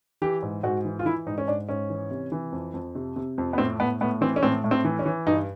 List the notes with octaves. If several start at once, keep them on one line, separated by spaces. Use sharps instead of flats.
E3 G4
G#2
G#2 F#4
E3
F4
E3 E4
G#2 D#4
C#4
G#2 D4
G#2 C#4
E3
C3
E3
F2
F2
C3
C3
F2
B3
A2 C4
A2 B3
A2 B3
E3 C4
C#4
A2 C4
A2
C4
E3
C#4
E3
G2 D#4